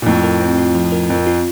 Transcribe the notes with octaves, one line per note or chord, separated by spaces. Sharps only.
A#2
F2 A2 F3
A#4
C4
F4
F3
A#4
F2 C4
F4